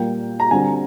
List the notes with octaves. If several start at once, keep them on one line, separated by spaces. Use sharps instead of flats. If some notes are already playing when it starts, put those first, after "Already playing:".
Already playing: A#2 G3 A#3 G5
A#5
D3 G3 C4 G#5